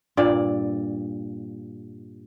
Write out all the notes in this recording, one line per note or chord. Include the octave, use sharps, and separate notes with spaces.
G2 A#2 D5